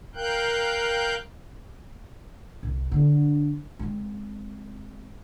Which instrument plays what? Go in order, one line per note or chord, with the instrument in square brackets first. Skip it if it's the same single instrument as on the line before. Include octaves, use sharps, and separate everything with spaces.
[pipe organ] A#4 F5 G5 F#6 G6
[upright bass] C2
D3 D4
G#3 C4